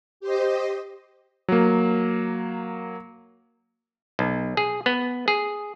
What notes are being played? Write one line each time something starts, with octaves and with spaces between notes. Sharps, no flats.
G4 C5 D#5
F#3 A#3
B1
G#4
B3
G#4